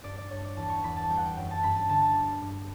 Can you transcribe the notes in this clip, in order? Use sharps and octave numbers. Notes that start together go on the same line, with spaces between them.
G2 D5
D5
G2 C#5
D5
E2 A5
C#6
E2 B5
A5
G3 G5
F#5
G5
F#2 G5
A5
G2 B5
A5
D3 A5
A5
G3
G2